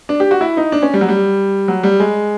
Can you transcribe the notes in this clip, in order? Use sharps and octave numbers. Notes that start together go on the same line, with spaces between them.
D4
G4
F#4
E4
D#4
D4
C#4
G3
F#3
G3
F#3
G3
G#3